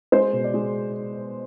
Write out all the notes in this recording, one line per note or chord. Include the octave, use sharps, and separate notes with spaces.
G#3 C5
B2
D5
G#3